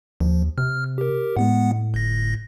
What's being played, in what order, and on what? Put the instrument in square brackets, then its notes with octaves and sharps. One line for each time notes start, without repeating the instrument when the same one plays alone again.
[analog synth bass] D#2 [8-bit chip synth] F3
[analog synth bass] C3 [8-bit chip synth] F6
[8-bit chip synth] G4 A#4
[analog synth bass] A2 [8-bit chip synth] G#3 B3 F#5
[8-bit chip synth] G1 A#6